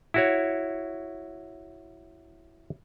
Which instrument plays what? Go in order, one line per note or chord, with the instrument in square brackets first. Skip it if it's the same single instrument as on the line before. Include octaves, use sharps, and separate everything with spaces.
[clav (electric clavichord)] E4 F#4 C#5